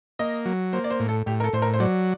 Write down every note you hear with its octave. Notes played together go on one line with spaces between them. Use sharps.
A#3 D#5
F#3
A#3 C5
D5
C5
A2
A4
A2 G4
A#4
A4
A2 C5
A#4
C5
F#3 D5